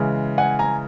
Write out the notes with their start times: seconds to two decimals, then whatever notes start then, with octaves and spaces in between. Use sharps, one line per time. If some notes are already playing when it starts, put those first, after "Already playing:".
Already playing: C#3 E3 G#3 C#4
0.38 F#5 G#5
0.59 G#5 A#5